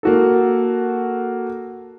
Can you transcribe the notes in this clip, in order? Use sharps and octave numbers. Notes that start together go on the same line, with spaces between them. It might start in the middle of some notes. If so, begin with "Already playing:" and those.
A#3 F#4 A4